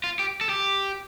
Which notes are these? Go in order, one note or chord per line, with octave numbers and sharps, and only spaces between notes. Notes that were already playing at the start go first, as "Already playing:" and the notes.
F4
G4
A4
G4